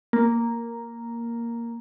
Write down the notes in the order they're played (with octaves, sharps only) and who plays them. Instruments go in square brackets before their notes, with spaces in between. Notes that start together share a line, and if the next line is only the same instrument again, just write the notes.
[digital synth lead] A#3